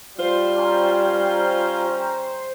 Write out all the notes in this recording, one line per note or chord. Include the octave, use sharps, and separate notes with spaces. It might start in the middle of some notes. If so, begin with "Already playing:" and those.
G3 F4 C5
C#4 G5 A#5